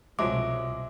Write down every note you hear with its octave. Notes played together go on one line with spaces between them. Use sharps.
C2 B2 F3 F#3 G#3 E5 D6